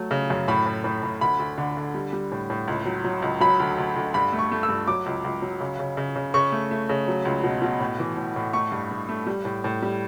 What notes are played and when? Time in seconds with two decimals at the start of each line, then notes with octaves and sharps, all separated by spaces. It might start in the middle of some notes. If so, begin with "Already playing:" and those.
Already playing: F#3 A3
0.11 C#3
0.30 F#2
0.48 A2 B5
0.66 A2
0.84 A2
1.03 A2
1.21 D2 B5
1.40 D2
1.58 D3
1.77 D3
1.94 G3
2.13 G3
2.32 A2
2.50 A2
2.68 C#2
2.85 F#3
3.04 F#3
3.22 C#2
3.40 F#3 B5
3.60 D2
3.78 D2
3.96 D2
4.14 G2 B5
4.33 A3
4.39 C#6
4.51 A3
4.63 E6
4.69 G2
4.88 F#3 D6
5.06 C#2
5.24 C#2
5.42 F#3
5.60 C#3
5.79 C#3
5.97 C#3
6.16 C#3
6.34 C#3 C#6
6.52 A3
6.71 A3
6.89 C#3
7.08 F#3
7.25 C#2
7.43 B2
7.62 B2
7.80 A2
7.99 E3
8.17 A2
8.36 A2
8.53 A3 C#6
8.72 G2
8.91 G2
9.09 A3
9.27 G3
9.45 A2
9.64 A2
9.82 G3